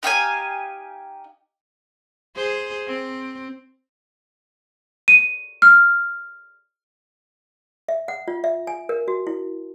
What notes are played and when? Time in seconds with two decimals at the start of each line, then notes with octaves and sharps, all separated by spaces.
0.03 D#4 G4 F5 G#5
2.36 G#4 C5
2.87 C4
5.08 D#7
5.62 F6
7.88 E5
8.08 F#5
8.28 F4
8.44 E5
8.67 G#5
8.89 A#4
9.08 F#4
9.27 E4